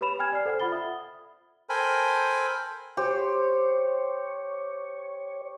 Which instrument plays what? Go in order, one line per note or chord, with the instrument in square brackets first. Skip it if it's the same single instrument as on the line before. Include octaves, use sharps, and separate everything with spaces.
[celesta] G4 B4 C#5 B5 E7 F7
G5 G#5 F6 G#6
D5 C7
A4 C5 F#5 G5 F6
F4 F#5 B5 A6 G7
E5 D#6
[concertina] A4 A#4 C5 G5 G#5 B5
[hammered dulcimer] G4 C5 [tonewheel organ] C#5